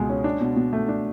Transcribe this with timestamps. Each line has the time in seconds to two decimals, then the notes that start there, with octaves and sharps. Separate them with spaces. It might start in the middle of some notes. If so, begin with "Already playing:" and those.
Already playing: C#2 B2 G#3
0.09 C#4
0.24 D4
0.41 B2
0.56 B2
0.73 A3
0.89 D4